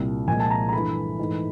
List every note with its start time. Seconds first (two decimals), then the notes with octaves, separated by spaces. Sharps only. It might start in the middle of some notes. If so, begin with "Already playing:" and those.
Already playing: C2 A#2 G3
0.27 C2 A#2 F3 G#3 G#5
0.40 A5
0.50 A#5
0.69 A#5
0.73 G2 E3 A3 B5
1.19 G#2 E3 A3